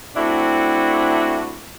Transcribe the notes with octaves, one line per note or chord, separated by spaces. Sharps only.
A3 C4 D4 E4 F#4